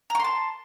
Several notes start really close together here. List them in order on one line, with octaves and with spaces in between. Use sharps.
A#5 C#6 C6 A5